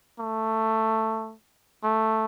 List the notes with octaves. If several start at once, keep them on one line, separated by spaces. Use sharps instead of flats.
A3
A3